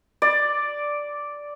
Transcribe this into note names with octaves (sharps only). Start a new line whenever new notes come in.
D5